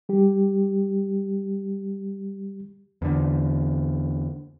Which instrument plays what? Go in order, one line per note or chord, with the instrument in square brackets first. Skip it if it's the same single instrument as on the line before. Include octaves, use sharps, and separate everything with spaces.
[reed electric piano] G3 G4
[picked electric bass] E2 D3